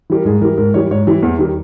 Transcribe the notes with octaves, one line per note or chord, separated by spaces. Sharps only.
E3 G3 A#4
G#2 G#4
E3 G3 A#4
G#2 A#4
E3 G3 C#5
G#2 C#5
E3 G3
E2
D#3 G3